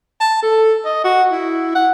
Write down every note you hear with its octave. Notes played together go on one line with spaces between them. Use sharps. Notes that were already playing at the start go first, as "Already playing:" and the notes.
A5
A4
D#5
F#4
E4
F#5